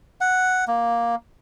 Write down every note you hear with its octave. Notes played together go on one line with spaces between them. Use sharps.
F#5
A#3